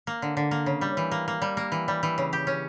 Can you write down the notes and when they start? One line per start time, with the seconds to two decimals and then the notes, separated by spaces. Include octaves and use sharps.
0.07 A#3
0.22 D3
0.37 D3
0.51 A#3
0.66 C#3
0.81 G3
0.97 E3
1.12 A#3
1.28 A#3
1.42 G3
1.57 A#3
1.72 E3
1.88 G3
2.03 E3
2.18 C#3
2.33 G4
2.47 C#4